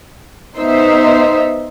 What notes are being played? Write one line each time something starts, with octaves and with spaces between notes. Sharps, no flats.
B3 D#4 C5 E5